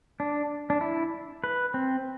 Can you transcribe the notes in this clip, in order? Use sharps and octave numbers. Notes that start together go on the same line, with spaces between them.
D4
D4
E4
B4
C4